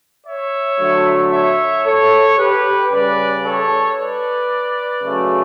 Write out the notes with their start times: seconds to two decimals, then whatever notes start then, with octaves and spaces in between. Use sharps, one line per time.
0.27 C#5 E5
0.80 D3 F#3 A3
1.33 C#5 E5
1.86 A4 C#5
2.39 G4 B4
2.92 C#3 G3 B4 D5
3.45 A4 C#5
3.98 B4 D5
5.04 C#3 F#3 A3